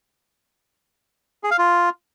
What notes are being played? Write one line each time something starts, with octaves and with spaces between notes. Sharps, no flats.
G#4
F5
F4